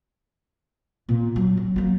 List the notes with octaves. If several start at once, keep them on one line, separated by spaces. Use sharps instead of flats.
A#2
F#3
F#3
F#3 A#3